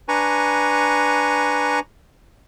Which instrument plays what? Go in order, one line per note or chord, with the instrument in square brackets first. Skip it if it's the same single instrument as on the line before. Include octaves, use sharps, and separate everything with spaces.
[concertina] D4 B4 G#5 A#5 C#6